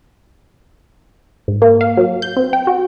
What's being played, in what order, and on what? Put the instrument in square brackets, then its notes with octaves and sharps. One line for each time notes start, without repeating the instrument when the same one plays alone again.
[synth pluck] G#2
A#3
F5
F#3
G6
C4
G5
F#4